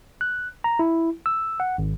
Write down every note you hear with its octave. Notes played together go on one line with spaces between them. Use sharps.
F#6
A#5
E4
E6
F#5
G#1